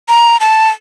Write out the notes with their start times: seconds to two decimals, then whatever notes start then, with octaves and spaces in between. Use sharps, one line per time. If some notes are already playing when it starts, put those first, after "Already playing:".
0.08 A#5
0.40 A5